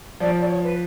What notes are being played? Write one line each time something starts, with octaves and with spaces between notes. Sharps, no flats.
F3 D5
D5
C#5
B4